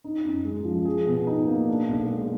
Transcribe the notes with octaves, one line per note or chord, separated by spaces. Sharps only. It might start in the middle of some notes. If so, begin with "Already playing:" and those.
D#4
F#2
G#3
F3
G#4
B2
D#4
A#3
D4
B1
G#3